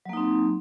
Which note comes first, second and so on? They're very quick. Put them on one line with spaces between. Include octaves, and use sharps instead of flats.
F#3 A#3 D#4 C4